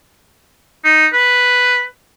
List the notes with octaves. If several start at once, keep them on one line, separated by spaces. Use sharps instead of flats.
D#4
B4